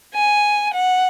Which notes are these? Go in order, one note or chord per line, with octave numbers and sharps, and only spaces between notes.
G#5
F#5